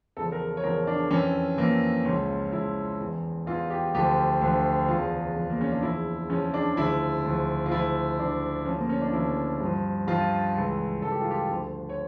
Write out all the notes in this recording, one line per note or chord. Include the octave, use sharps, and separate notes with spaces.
E2 C#3 F3 A4
A#4
C#5
E2 C#3 F3 A#4
D4
F2 E3 C#4
F2 E3 A#3
C#2 C#3 F3 C#4
C#2 C#3 F3 E4
E2 E3
E2 E3 F4
G4
D2 D3 F3 G4
D2 D3 F3
E2 C#3 F3 F4
E2 C#3 F3
A#3
C#4
D4
E2 C#3 F3 E4
E2 C#3 F3 C#4
D4
D2 C#3 F3 E4
D2 C#3 F3
F4
D2 C#3 F3 E4
D2 C#3 F3 D4
D2 C#3 F3 C#4
A#3
C#4
D4
D2 C#3 F3 E4
G2 F3
G2 F3 F4
C#2 C#3 E3
C#2 C#3 E3 A4
G4
F4
G4
D2 D3 F3
C#5